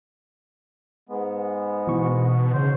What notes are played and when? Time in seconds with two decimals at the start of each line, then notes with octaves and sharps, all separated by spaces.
1.09 G#2 G#3 B3
1.87 B2 E3 C#6
2.53 G#2 C#3 C#4 C5